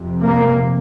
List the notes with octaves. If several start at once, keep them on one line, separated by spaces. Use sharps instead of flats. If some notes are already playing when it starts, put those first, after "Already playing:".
Already playing: F2 C3
A#3